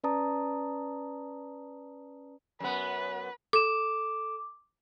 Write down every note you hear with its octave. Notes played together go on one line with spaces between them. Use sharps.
C#4 B4 D5 A5 A#5 D#6
F#2 B3 B4
A4 D6 E7